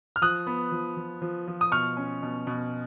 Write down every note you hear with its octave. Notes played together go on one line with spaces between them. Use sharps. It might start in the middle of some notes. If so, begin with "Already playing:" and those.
F6
F3 D#6 F#6
B3
F3
F3
F3
F3
D#6
B2 C#6 F6
C#4
B2
B2